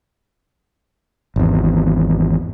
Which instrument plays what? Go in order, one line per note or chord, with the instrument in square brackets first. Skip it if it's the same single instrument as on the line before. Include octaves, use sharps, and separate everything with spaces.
[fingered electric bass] G#1 E2